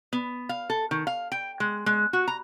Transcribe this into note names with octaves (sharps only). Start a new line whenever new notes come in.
B3
F5
A4
D#3
F5
G5
G#3
G#3
F#4
A#5